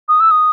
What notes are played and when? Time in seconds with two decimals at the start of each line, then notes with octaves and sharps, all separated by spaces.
0.09 D#6
0.20 E6
0.31 D#6